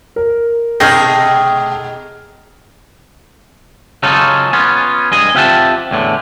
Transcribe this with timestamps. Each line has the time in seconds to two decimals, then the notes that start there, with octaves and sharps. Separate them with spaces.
0.16 A#4
0.80 B2 A3 D#4 G#4 G5 F6 A#6
4.03 C#3 F#3 C#4 D#4 F4 A4
4.53 B3 C#4 F4
5.12 G2 G#4 D#5
5.35 C4 F4 G4 E5 F#5 A5
5.91 E2 A2 D3